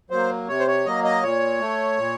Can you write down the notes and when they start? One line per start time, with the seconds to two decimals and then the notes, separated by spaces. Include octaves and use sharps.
0.10 F#3 A#3 C5
0.48 C3 C#5
0.60 C5
0.67 C#5
0.86 F#3 A#3 D#5
1.04 D#5
1.23 A#2 C#5
1.61 A3
1.98 A#2